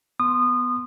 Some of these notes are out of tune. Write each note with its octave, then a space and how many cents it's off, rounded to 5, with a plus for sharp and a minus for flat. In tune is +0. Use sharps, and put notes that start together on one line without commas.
B3 +0 C6 +0 D#6 -25